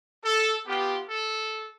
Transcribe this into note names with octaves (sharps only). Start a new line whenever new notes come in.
A4
B3 F4 G4
A4